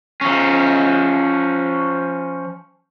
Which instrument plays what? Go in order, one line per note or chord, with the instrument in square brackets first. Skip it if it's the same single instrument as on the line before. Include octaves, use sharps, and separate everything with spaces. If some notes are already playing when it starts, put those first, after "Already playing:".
[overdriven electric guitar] F3 C#4